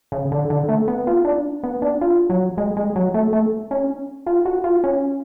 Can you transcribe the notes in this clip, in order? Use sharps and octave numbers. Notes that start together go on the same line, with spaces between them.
C#3
D3
D3
A3
B3
F4
D4
B3
D4
F4
F#3
G#3
G#3
F#3
A3
A3
C#4
F4
F#4
F4
C#4